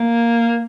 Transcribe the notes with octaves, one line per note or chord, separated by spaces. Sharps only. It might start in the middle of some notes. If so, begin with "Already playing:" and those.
Already playing: A#3